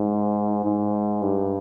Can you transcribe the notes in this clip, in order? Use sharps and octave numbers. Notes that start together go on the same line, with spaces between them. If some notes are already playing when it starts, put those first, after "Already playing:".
Already playing: G#2
G#2
G2